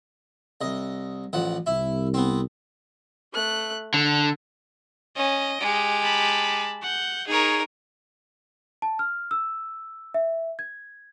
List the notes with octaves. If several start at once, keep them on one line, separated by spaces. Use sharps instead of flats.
C2 D#5
A1 F3 F#5
C2 E4
B3 C4
A3 F#6
D3 A4
C#4 D#5
G#3 G4
A5 B5
F#5 G6
D#4 G#4 A#4 C#5
A5
F6
E6
E5
G#6